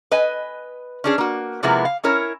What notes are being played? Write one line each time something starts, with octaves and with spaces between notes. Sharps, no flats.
B4 D#5 G#5
C#4 D4 G#4
A#3 F#4
C3 F3 G#3 A#3 B3 E4
F5
C#4 E4 A#4 C#5